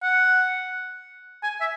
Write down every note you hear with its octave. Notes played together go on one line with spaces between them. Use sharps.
F#5
G#5
E5